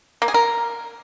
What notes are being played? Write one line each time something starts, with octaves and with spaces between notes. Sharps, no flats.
A#3
G#4
A#4